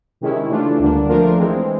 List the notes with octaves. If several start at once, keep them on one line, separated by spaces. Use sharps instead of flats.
C3 D#3 G#3 C#4 E4
C#3 E3 A3 D4 F4
D2 D3 G3 A#3 D4
F3 A3 D4 F4 A#4
E3 G#3 C4